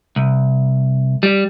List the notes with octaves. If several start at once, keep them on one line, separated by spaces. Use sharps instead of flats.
C2
G3